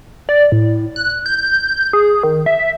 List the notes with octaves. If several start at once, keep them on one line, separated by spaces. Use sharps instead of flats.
D5
A2
F#6
G6
G#4
D#3
E5